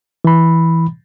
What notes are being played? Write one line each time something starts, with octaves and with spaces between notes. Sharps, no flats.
E3 B5